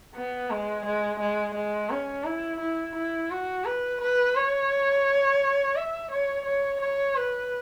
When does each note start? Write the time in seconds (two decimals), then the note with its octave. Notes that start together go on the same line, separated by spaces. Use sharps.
0.15 B3
0.51 G#3
0.86 G#3
1.20 G#3
1.55 G#3
1.90 C#4
2.25 E4
2.60 E4
2.95 E4
3.30 F#4
3.65 B4
4.01 B4
4.35 C#5
5.76 E5
6.11 C#5
6.46 C#5
6.81 C#5
7.16 B4